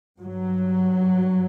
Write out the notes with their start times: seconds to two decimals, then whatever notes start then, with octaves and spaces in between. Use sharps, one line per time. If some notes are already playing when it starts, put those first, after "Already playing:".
0.21 G2 F#3